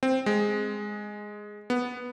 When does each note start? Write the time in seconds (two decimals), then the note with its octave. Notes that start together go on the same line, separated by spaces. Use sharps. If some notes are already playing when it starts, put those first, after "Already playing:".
0.03 C4
0.26 G#3
1.70 B3